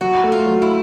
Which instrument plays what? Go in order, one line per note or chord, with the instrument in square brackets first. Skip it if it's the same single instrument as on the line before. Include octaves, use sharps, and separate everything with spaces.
[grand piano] F#3 [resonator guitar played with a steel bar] F#4
[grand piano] A3
[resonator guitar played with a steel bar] F4
[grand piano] F#3
[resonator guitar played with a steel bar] E4